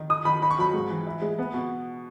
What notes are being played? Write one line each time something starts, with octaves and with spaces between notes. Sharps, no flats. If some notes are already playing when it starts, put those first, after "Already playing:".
Already playing: D#3
D#4 D#6
D#3 B5
D#4 B5
C#6
F#3 B5
G#2
E3
E4
G#3
B3
B2